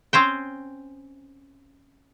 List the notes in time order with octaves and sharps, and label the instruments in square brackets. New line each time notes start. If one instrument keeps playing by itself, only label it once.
[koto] C4 C#4 C5 G5